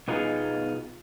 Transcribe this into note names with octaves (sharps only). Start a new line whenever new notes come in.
B2 B3 D#4 F4 G#4